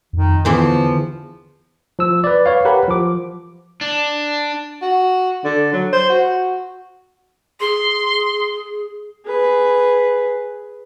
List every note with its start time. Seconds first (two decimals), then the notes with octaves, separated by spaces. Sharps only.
0.13 F2 D#3
0.45 E2 D3 E3 F3 C5
1.99 F3 E6
2.24 B4 D5
2.46 B4 C#5 F5
2.65 G4 A#4 B4 F#5 B5
2.88 F3 D6
3.81 D4
4.82 F#4
5.44 D3
5.73 F#3
5.93 C5
6.09 F#4
7.60 G#4 C6
9.26 G#4 B4